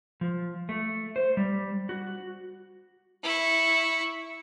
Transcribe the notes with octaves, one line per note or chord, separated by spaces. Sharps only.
F3
A3
C5
G3
F#4
E4 C#6